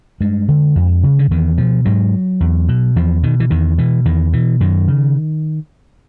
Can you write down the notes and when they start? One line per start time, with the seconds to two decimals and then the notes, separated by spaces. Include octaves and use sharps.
0.21 G2 G#3
0.48 D3
0.76 F2
1.03 C#3
1.19 D3
1.31 E2 D#3
1.58 B2 F3
1.85 G#2 F#3
2.40 E2
2.68 B2
2.96 E2 F3
3.23 B2 D#3
3.40 E3
3.50 E2 D#3
3.78 B2 E3
4.05 E2 D#3
4.33 B2 E3
4.60 F#2 D#3
4.88 C#3